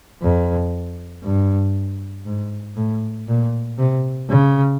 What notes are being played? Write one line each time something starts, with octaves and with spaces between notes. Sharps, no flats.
F2
G2
G#2
A2
A#2
C3
C#3